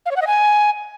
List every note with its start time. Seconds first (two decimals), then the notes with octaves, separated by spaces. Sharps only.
0.06 F5
0.11 C#5
0.16 F#5
0.22 D#5
0.27 G#5